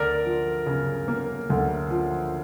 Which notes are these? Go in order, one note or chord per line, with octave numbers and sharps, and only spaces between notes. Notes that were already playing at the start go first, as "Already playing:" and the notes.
Already playing: D2 A#4 D5
F3
C#3
A#3
D2
F3